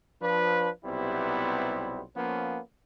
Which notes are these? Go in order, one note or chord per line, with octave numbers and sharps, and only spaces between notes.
F3 D4 B4
B1 C3 G3 B3 E4 C5
F3 A#3 B3 C#4